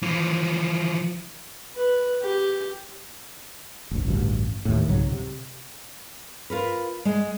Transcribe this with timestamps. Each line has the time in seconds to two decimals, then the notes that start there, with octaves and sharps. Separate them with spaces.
0.03 E3 F3
1.75 B4
2.22 G4
3.91 F1 A#1
4.08 A1 D2 G2
4.65 D#2 A2
4.88 C2 G#2 C#3 F#3
5.12 C3
6.50 F4 A#4 B4
7.05 G#3